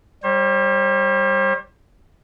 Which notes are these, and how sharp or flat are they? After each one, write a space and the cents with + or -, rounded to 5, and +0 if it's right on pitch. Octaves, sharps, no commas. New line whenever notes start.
G3 +0 C5 +45